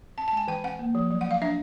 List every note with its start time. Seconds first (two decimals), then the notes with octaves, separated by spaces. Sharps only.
0.18 C4 A5
0.28 A5
0.32 G#3 G#5
0.48 E3 G5
0.64 C4 F#5
0.79 A#3
0.95 F3
1.11 F#3
1.21 F#5
1.26 F#3 F5
1.42 D4 E5